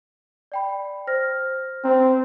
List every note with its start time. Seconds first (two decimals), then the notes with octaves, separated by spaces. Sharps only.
0.52 D5 G5 B5
1.07 C5 F6 A#6
1.84 C4 A#5